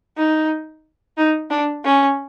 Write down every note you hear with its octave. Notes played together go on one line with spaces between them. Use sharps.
D#4
D#4
D4
C#4